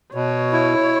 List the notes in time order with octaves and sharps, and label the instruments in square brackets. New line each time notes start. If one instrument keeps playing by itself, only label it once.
[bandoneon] B2 [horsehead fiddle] C#5
[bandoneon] E4